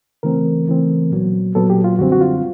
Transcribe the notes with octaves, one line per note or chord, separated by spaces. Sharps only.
C#3 E3 A3 C4 A#4
C#3 E3 A3 C4
A#2 F#3 B3
A#2 F#3 B3 A4
G4
F4
F#2 D3 G3 C4 F#4
F#4
F4